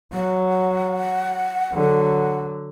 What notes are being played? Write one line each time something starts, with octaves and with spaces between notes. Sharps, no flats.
F#3 F#5
D3 F#3